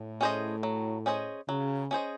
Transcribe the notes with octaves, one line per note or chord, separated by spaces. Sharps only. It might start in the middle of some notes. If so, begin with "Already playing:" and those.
Already playing: A2
C#4 G#4 C5 D#5
F#3
C#4 G#4 C5 D#5
C#3 F#3
C#4 G#4 C5 D#5